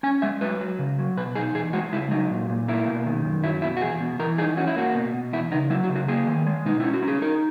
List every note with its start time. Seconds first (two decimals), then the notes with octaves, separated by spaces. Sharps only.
0.03 C#4 G#5
0.22 G#3 E5
0.41 F#3 B4
0.61 F#3
0.79 C#3
0.99 F#3
1.17 B2 B4
1.36 D#4 G#4
1.55 E2 G#4
1.73 G#3 F#4
1.93 C#3 E4
2.11 F#3 D#4
2.31 A#2
2.50 A#2
2.68 A#3 E4
2.87 B2
3.06 D#3
3.25 F#2
3.43 F#3 E4
3.62 B2 E4
3.77 F#4
3.82 E2 G#4
4.00 B2
4.19 E3 A#4
4.38 D#4 G#4
4.57 C#4 F#4
4.67 E4
4.76 A#3 F#4
4.95 B2
5.14 B2
5.33 E2 E4
5.52 C#3 D#4
5.70 F#3 E4
5.84 F#4
5.89 C#3
5.96 F#4
6.08 A#3 G#4
6.27 D#3
6.47 G#3
6.65 B2 D#4
6.80 C#4 E4
6.94 F#4
7.02 C#4
7.08 G#4
7.22 D#4 A#4